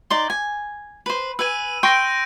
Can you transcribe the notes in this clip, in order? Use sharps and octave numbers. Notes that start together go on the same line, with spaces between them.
D#4 D5 C6
G#5
B4 C5
B4 G#5 E6 D#7
G5 C6 C#6 G6 A#6 D7